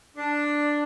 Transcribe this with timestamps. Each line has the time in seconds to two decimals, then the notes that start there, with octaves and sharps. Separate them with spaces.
0.17 D4